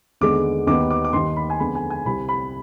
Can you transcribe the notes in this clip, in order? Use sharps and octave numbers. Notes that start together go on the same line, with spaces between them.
D#2 D3 G#3 B3 D6
D#2 D#3 G3 B3 D6
D6
D6
D#2 D#3 G3 C6
B5
G#5
F2 D3 G#3 B3 B5
G#5
G#5
C2 C3 G3 C4 B5
B5